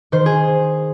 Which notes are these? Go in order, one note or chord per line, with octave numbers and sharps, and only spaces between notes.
D#3 C5
G#4